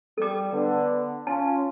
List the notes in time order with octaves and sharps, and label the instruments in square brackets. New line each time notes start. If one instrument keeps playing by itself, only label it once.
[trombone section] G3 G4 [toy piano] A4 D6
[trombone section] D3 B3
[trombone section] C#4 F4 [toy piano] A5